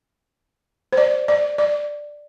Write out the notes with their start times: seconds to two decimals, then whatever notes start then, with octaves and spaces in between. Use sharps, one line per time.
0.93 C5
0.97 D5
1.28 D5
1.58 D5